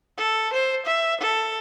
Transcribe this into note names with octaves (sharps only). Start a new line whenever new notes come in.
A4
C5
E5
A4